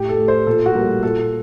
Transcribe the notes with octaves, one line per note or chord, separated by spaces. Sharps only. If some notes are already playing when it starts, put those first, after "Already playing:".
Already playing: A2 G4
A4
A3
C5
A#2 A4
F#4
G3 A#3
A#2 A4